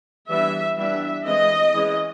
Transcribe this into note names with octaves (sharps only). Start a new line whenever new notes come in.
E3 G3 B3 D4 E5
E3 G3 B3 D4 E5
E3 G#3 C4 D#5
E3 G#3 C#4